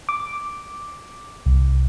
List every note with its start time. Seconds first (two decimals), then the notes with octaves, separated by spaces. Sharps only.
0.09 D6
1.46 C2